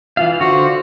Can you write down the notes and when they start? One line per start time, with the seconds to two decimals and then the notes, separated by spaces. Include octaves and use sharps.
0.17 E3 F4 F5
0.41 D3 F#4 C5